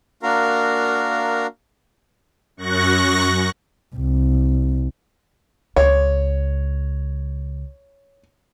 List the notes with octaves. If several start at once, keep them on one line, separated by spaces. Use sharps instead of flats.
A#3 D4 F#4 A#4 F5 A#5
F#2 C#6 F#6 A#6
C2
C#2 C#5